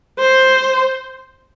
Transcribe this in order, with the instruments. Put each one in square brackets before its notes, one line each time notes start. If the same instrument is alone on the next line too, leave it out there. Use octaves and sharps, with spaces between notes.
[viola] C5